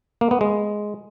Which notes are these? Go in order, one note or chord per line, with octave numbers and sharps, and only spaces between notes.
A#3
B3
G#3